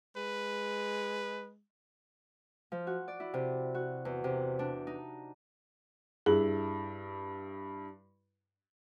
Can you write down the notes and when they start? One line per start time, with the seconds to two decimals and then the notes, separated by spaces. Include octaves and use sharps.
0.17 G#3 B4
2.72 F3
2.87 F#4
3.08 D5
3.20 E4
3.34 C3
3.75 F#4
4.05 E2
4.24 C3
4.59 D4
4.87 D#4
6.26 G2 E4 G#4 F#7